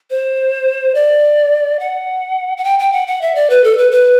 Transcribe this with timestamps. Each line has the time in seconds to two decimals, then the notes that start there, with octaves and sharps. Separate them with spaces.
0.10 C5
0.95 D5
1.80 F#5
2.57 F#5
2.64 G5
2.79 G5
2.93 F#5
3.07 F#5
3.22 E5
3.35 D5
3.50 B4
3.64 A4
3.78 B4
3.92 B4